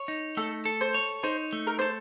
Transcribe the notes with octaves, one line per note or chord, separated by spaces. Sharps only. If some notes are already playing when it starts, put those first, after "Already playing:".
Already playing: C#5
D#4
A3 A4
A4
C5
C#5
D#4 C5
A3
A#4
A4 C5